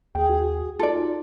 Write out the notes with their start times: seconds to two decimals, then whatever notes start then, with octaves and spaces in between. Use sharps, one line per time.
0.15 D#2 G#4 G5
0.30 F#4
0.79 D#4 F4 A4 D5